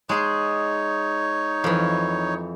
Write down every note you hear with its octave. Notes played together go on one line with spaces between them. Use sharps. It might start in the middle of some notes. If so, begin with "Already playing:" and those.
G#3 D#4 G#4 C#5 C6
F2 E3